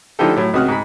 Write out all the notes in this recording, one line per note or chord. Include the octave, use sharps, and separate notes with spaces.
D3 F3 D#4 E4 G4 A4
A2 F#3
C#2 C3 F#4 D#6 F6 F#6
G#2 B5